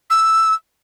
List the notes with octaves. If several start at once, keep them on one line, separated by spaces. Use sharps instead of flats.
E6